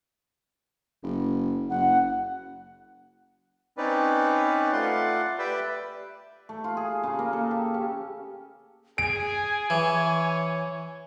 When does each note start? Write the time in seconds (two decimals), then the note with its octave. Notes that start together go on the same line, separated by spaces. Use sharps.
1.03 F#1
1.70 F#1 F#5
3.78 C4 C#4 D#4 B4 D5
4.73 A3 F4 D5 F#5 C6
5.39 G4 B4 D5 E5 G5
6.49 A3
6.64 F4
6.77 G#4
7.03 C#3
7.19 A#3
7.33 A4
7.51 G4
7.74 C#4
8.98 G#4 G#5 D7
9.70 E3 C#5